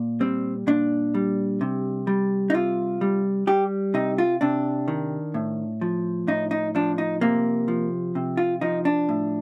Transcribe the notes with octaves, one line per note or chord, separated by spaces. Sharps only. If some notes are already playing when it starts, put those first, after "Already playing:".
Already playing: A#2
G3 C4
A#2 D4
G3
C3
G3
D#4
C3 F4
G3
G3 G4
C3 D#4
F4
C3 D4
D#3
A2
F3
A2 D#4
D#4
F3 D4
D#4
C3 A#3
F3
C3
F4
F3 D#4
D4
A2